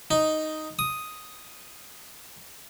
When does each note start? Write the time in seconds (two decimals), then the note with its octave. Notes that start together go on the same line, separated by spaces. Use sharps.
0.11 D#4
0.79 D#6